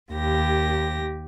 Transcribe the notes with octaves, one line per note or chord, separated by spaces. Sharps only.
D#2 G4 A#6